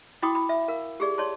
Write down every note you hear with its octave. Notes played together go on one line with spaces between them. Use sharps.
E4 F#4 G5 B5 D6 D#6
B5
E5
A#4 F5
G4 G#4 D5
C#5 D5 A5 C6